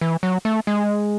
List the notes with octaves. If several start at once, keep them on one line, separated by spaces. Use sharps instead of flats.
E3
F#3
A3
G#3